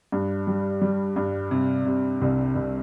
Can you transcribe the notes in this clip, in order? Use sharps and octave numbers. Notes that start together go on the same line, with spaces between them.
G2
G3
G3
G2
C3
C3
C2
C2